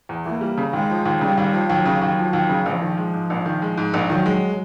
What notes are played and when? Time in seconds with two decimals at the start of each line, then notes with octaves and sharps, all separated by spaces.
0.09 E2
0.25 E3 A#3
0.41 G3
0.58 C#3
0.73 D#2 G#3
0.90 F3
1.06 D#2
1.21 C#3 G3
1.38 D#2
1.54 F3
1.70 D#2 F#3
1.86 C#3
2.02 D#2
2.18 F3
2.33 D#2
2.50 C#3
2.66 A#1 F3
2.82 D#3
2.97 G#3
3.14 G#2
3.30 A#1
3.46 D#3
3.62 G#3
3.77 G#2
3.94 A#1
4.10 D#3 F#3
4.26 G#3